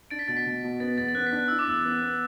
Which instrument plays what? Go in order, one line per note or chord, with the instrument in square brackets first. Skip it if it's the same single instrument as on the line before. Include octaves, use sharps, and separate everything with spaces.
[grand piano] D4 [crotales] A6 D7
[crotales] B6
[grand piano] B2 [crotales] A6
[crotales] B6
[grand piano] B2
B2
[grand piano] B3 [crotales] A6
[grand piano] E2 [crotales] A6
[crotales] A6
[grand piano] B3 [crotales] F#6
[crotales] B6
[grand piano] D4
[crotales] F#6
[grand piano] E4 [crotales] E6
[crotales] D6
[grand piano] E2 [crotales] E6
[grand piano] B3
B3